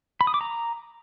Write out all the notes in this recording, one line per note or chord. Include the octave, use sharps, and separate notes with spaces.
B5
D#6
D6
A#5